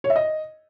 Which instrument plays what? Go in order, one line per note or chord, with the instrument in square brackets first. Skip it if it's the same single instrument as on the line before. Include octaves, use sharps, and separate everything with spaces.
[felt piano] C#5
E5
D#5